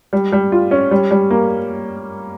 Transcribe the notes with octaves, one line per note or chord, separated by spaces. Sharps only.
G3
G3
F4
C#4
G3
G3
A#3